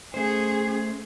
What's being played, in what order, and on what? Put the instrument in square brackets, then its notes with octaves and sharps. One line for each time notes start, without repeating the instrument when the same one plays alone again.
[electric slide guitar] A3 C5 [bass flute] C#4 [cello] G#4